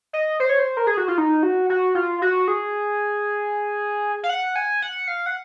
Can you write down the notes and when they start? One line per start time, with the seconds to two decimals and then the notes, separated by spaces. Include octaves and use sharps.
0.13 D#5
0.40 C5
0.49 C#5
0.59 C5
0.77 A#4
0.87 G#4
0.97 F#4
1.08 F4
1.18 D#4
1.43 F#4
1.70 F#4
1.95 F4
2.22 F#4
2.48 G#4
4.23 F5
4.29 F#5
4.56 G#5
4.82 F#5
5.08 F5
5.26 F#5